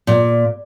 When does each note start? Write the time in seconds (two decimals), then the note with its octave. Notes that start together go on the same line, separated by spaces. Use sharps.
0.07 A#2